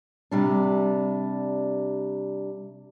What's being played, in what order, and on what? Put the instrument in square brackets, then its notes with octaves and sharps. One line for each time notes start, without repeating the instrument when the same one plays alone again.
[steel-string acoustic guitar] C3 G3 D4